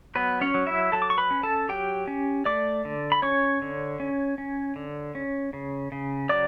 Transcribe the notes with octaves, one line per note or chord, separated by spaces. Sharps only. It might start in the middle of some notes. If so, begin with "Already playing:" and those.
F#3 B3 B4
C#4 C#5
F#3
E4 E5
F#3 A4 A5
D6
C#6
B4 B5
C#4
A4 A5
F#3 G4 G5
C#4
A3 D5 D6
D3
B5
C#4 C#5 C#6
D3
C#4
C#4
D3
C#4
C#3
C#3
F#3 D5 D6